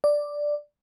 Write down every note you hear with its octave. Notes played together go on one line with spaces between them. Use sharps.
D5